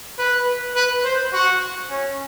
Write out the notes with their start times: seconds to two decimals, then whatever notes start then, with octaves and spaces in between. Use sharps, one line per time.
0.19 B4
0.75 B4
1.04 C5
1.33 F#4
1.90 C#4